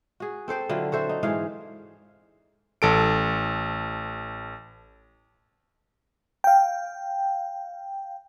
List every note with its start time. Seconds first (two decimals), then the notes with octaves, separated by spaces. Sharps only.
0.20 F#4 G#4
0.48 C4 A4 C5 G5
0.69 D3 F#3 E4 F4
0.92 F#4 A4 C5 E5
1.09 D#4
1.23 G#2 E3 G#4 F5
2.82 A1 A4 D7
6.44 F5 G5